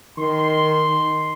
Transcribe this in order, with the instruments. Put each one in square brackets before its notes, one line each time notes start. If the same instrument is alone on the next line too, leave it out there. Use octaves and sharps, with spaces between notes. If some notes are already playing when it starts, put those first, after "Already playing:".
[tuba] D#3 [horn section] C6